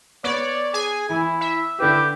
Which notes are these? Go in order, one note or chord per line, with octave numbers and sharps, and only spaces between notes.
B3 C#5 D5
G#4 G#5
E3 E4
E5
D3 E4 G4 B4